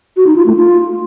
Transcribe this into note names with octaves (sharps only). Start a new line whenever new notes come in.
F#4
D#4
F4
A3
F4